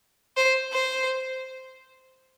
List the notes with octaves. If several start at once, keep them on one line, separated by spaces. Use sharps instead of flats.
C5
C5